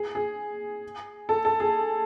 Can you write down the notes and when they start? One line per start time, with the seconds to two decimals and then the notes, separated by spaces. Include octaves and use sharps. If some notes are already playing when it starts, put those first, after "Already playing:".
Already playing: G#4
0.15 G#4
1.29 A4
1.45 A4
1.60 G#4